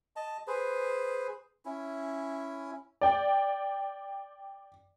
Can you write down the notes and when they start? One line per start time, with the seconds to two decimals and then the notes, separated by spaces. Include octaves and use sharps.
0.16 D#5 A5
0.47 G#4 B4 C5
1.65 C#4 E4
3.01 D5 G5